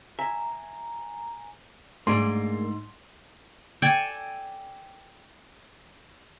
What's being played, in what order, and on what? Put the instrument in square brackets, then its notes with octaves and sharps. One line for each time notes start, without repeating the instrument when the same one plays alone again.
[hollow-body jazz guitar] E5 [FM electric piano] G#5 A#5
[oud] G#2 [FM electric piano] A3 D4 [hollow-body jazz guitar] A#3 G#4 D5 [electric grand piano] C6
[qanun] A4 D5 G5 G#5